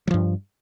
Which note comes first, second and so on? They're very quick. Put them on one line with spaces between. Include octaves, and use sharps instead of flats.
F#3 F3 G2